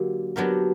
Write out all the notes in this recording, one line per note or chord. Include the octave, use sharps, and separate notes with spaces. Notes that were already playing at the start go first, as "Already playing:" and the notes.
Already playing: D3 F#3 A#3 G4
F#3 B3 D4 G4 A#4